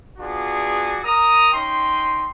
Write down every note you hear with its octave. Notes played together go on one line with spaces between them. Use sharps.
B3 D4 F4 F#4 G#4 D5
A#4 A#5 D#6
C#4 D#4 G5 C6